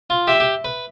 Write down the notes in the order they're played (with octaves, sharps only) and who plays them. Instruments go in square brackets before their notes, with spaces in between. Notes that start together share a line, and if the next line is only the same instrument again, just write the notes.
[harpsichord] F4
[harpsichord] G4 [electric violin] E5
[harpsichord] G4
B4